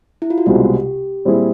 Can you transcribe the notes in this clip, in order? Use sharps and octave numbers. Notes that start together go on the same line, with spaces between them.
E4
F4
F#4
C2 B2 G#3 C4 G4
A#2 G3 C4 E4 G#4